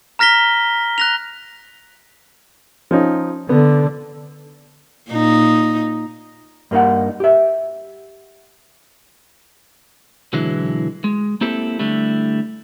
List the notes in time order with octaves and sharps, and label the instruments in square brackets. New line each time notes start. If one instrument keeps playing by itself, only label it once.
[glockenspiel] A#5 F6 A#6 B6 G7
F#6 A#6 F7
[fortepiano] F3 C#4 D#4
[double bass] D3 [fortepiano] B3
[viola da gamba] A#2 D#4
[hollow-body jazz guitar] G2 A#3 D#4 F#5
G4 E5
[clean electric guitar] B1 D3 E3 F#3 G#3 E4
G#3
A#3 C4 E4 G4 A4
D3 G3 A3 E4